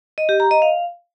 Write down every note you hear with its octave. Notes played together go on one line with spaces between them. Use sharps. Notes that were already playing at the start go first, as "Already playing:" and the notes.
D#5
G4
A#5
D#5
F5